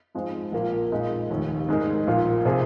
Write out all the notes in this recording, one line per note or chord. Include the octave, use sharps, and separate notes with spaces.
G#2 F3 G#3 C4
A#1 A#2 A#3 F4
A#2 G#3 D#4
F1 D#2 D#3
G#2 G#3 D#4 A#4
A#1 A#2 A#3 F4
C3 F3 C4 G#4